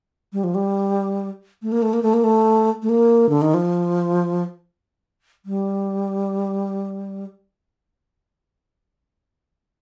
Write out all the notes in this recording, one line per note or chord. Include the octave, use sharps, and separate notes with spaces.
G3
F3
G3
A3
A#3
A3
A#3
A3
A#3
A3
A3
A#3
D3
D#3
F3
G3